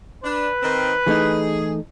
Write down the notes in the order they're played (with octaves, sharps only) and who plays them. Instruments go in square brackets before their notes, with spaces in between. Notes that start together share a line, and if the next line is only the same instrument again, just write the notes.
[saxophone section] D4 [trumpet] B4
[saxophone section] D#3 C4
[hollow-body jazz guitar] E3 A3 D#4 [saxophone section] G#4